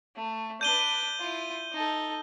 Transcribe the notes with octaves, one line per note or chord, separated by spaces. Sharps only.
A3
D4 B4 G6 D#7 G7
E4 F4
D#4 A4